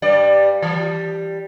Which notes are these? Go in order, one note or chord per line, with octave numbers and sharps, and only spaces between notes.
G2 G3 D5
E3 G3